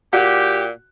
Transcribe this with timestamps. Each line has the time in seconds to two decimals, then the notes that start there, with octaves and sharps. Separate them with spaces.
0.13 A#2 F#4 G4